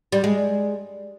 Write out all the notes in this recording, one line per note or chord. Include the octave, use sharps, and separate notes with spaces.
G3
G#3